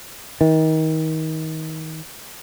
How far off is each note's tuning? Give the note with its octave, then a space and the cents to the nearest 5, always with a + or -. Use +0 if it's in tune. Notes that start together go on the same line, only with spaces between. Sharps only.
D#3 +30